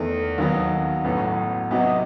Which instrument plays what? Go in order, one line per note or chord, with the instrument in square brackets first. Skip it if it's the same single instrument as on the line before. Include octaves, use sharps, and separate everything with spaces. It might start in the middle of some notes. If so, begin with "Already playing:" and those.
Already playing: [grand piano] E2 D#3 A3
D#2 D#3 F#3 B3
A1 A2 F#3 B3
C3 F#3 B3 D#4 F#4